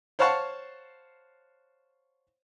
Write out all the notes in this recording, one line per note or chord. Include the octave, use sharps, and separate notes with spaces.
C5 C#5 F5 F#5 A5 C#6